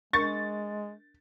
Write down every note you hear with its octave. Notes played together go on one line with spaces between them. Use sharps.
G#3 D4 A#4 C#6 A6